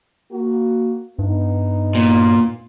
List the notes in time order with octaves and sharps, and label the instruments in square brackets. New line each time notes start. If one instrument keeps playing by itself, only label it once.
[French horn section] A#3 F#4
[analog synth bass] G2 [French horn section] B3 D#4
[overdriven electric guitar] A#2